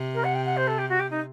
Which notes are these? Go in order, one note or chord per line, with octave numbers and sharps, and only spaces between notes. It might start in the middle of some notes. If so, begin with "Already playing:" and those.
Already playing: C3
A#4
F#5
G5
F#5
C5
A4
G4
F#4
G4
D#4